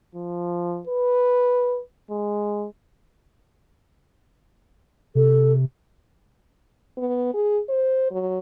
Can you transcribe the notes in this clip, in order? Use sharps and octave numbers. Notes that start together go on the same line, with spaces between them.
F3
B4
G#3
C3 A4
B3
G#4
C5
F#3